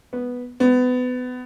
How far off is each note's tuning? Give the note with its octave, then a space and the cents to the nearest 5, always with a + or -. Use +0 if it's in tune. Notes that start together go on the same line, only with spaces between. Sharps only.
B3 -5
B3 +25